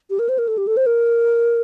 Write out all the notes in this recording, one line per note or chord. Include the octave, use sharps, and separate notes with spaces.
G4
A#4
C5
A#4
A4
G4
A4
C5
A#4